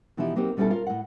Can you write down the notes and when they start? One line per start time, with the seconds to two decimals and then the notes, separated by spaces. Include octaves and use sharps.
0.17 B2 E3 F3 D#4 E4 G4
0.36 F#3 A#3 C4 D#4 G4
0.57 B2 G3 C#4 D#4 E4 A4
0.70 F4 A#4
0.87 A2 F#5